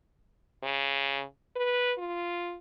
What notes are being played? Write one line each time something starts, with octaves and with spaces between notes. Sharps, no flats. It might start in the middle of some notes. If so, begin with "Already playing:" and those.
C#3
B4
F4